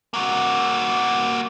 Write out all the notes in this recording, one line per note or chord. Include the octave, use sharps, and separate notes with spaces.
A#3 F#4